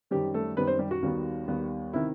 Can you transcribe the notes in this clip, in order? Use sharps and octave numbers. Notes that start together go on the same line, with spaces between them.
F#2 D#3 G3 C4 G4
A3 A4
F#2 D#3 G3 B3 C4 B4
C4 C5
G3 G4
F#4
D#2 D#3 G3 B3
D#2 D#3 G3 B3
C3 D#3 E4